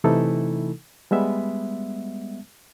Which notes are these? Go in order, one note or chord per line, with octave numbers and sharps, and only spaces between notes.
C3 E3 A3 D#4 E4 A4
G3 G#3 B3 E5